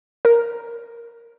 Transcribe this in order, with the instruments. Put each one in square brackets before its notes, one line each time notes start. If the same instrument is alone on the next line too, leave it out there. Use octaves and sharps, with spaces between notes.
[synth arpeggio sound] A#4